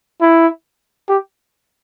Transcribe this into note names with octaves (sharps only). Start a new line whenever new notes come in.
E4
G4